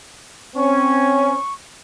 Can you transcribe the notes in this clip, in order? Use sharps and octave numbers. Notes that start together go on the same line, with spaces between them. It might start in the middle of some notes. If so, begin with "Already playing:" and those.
C4 C#4 C#6